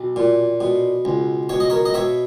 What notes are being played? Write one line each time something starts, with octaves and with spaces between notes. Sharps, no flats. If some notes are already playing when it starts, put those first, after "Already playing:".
Already playing: B1
A#2
B2
C#2
B2 C#5
D#5
A#4 C#5
D#5
B2 C#5 E5